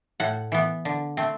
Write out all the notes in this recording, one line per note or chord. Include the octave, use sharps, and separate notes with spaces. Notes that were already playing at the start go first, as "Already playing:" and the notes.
A2 F#5
E3 B3
D3
A3 C4